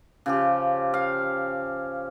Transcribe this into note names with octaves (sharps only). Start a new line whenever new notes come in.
C#3 F3 G4
F5